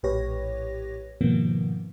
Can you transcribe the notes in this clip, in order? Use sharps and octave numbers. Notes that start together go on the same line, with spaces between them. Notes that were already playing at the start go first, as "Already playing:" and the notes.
A#1 A2 G4 B4 C#5 A#6
G#2 B2 D#3 F3 A#3 B3